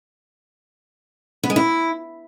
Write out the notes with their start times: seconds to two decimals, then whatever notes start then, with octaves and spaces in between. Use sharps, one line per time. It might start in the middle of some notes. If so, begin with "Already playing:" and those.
1.43 B3
1.50 G#3
1.56 E4